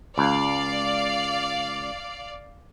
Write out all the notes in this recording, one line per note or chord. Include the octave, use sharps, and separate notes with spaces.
C#2 D5 F5